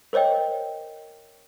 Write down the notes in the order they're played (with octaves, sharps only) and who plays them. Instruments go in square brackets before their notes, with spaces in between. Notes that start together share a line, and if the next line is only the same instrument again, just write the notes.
[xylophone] A#4 C5 C#5 D#5 G5